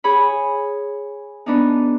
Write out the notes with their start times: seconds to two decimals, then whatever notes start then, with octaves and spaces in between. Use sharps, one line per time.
0.04 G#4 C#5 B5
1.46 B3 D4 D#4